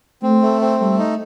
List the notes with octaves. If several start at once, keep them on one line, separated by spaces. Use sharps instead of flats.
A3 C4
A3
C4
G3 A3
D#4